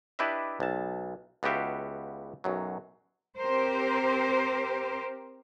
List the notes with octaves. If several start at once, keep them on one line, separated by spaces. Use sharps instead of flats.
D4 E4 G4 B4 D#5 E5
B1 A5
C#2 B3 F#4 G4 E5 F5
B1 F#2 F#3
C4 G4 A#4 C5